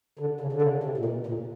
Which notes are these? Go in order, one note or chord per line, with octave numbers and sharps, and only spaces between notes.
D3
C#3
D3
C#3
C3
A#2
B2
A#2